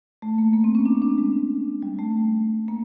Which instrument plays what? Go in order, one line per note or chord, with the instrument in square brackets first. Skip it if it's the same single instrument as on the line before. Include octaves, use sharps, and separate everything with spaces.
[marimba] A3
A#3
A#3
C4
C#4
D4
D4
G#3
G3
A3
A#3